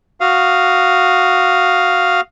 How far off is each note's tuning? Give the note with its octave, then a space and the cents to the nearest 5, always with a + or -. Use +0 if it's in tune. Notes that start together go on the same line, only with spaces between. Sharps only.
F#4 +0 F5 +0 D#6 +0